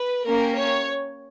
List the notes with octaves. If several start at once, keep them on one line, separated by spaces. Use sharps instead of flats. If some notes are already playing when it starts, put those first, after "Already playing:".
Already playing: B4
A#3 C#4 G4 A#4
C#5